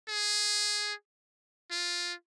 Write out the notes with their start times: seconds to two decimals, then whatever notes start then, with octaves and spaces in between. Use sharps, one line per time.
0.08 G#4
1.71 F4